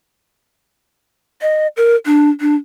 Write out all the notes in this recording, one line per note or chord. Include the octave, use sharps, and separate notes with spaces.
D#5
A#4
D4
D4